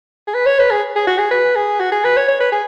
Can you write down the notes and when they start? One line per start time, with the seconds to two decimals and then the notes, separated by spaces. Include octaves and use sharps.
0.28 G#4
0.35 B4
0.46 C#5
0.59 B4
0.71 G#4
0.96 G#4
1.07 F#4
1.19 G#4
1.31 B4
1.56 G#4
1.80 F#4
1.92 G#4
2.04 B4
2.17 C#5
2.28 C#5
2.40 B4
2.52 G#4